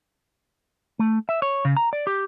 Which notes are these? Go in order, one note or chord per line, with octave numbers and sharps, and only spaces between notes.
A3
E5
C#5
C#3
A#5
D5
G4